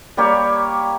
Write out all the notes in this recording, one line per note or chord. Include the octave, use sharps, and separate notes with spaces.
G3 A#3 G4 C#5